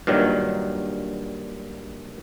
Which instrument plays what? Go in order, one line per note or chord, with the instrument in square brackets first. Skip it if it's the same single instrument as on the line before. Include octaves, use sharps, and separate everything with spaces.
[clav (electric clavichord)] G2 A#2 D#3 F#3